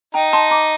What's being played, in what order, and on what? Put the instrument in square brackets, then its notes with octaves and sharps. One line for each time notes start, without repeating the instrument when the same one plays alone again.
[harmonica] D#4 [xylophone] G5 A#5
[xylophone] A5 C6
A#5 D6